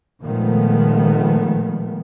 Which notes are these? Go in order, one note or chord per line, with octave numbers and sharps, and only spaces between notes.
A#2 D#3 F3 G#3 A3 B3